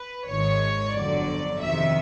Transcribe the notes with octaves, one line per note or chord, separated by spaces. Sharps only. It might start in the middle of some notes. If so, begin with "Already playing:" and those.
Already playing: B4
G#1 G#2 D#3 C#5
G1 F2 D3 F#3 D5
F2 C3 D#3 E5